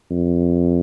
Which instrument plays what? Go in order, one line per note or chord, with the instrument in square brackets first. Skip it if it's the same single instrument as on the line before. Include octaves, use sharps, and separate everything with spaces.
[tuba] F2